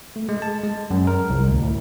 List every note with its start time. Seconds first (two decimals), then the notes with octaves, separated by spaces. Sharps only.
0.16 A3
0.29 G#3
0.42 A5
0.64 G#3
0.91 F#2
1.07 A#4
1.30 C2
1.48 D2
1.62 A2